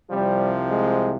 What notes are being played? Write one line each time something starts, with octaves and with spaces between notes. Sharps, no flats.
C2 C3 F3 G3
G#3